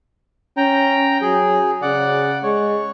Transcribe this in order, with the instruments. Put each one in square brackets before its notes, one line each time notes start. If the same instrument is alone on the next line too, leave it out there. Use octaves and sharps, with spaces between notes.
[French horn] C#4 [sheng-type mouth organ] G5 A#5
[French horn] F#3 [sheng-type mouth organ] G#4
[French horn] C#3 [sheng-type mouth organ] D5 F#5
[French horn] G#3 [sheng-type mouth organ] C#5